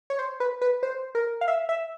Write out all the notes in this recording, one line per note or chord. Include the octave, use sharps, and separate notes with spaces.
C#5
C5
B4
B4
C5
A#4
F5
E5
E5